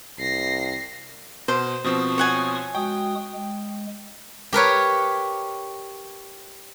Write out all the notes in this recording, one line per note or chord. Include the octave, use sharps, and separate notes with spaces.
C2 A#6 C7
B2 C5
B2 F3 C4 C#6 D#6
C#5 F#5 G#5
G#3 F#4 G5 D#6
G#3
G4 A#4 B4 C#5